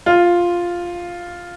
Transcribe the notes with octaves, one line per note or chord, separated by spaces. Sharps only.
F4